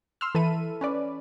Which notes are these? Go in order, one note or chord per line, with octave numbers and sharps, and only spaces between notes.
C6 E6 F6
E3 A4 E5 B5 D#7
C#4 B4 D5